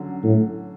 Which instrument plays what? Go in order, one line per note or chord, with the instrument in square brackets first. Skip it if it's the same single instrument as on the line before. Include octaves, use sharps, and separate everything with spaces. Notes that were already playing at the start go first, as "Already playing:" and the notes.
Already playing: [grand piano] D3 F#3 C#4
[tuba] A2